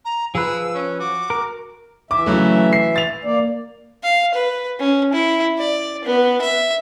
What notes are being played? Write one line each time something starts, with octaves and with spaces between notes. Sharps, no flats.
A#5
F3 G#4 B4 E6
C#4
F#4 D6
A#4
E3 E5 D6
C#3 F#3 A3
C7
A6 F7
A#3 D5
F5
B4
C#4
E4
D5
B3
E5